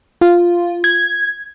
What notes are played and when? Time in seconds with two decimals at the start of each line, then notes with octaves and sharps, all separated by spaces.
0.21 F4
0.84 G#6